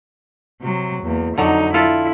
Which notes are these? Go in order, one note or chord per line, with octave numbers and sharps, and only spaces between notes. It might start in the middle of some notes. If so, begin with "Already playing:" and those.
C3 F#3
E2 A#3
F2 D3 F#3 D#4
E4 F4 A4